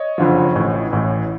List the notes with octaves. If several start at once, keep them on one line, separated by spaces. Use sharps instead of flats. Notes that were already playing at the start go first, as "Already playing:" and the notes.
Already playing: C#5 D#5
F#1 F2 D3 F3
A1 A2 E3
A1 A2 E3